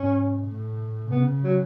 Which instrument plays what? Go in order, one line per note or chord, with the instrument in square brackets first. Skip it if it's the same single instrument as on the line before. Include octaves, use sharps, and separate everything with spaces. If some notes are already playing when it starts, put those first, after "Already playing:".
Already playing: [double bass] G#2 [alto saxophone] C#4
[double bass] A2
[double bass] C#3 [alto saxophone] B3
[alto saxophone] F#3